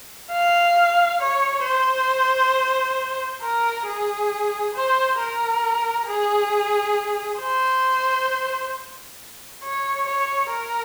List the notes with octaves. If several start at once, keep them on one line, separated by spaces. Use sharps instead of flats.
F5
C#5
C5
A#4
G#4
C5
A#4
G#4
C5
C#5
C#5
A#4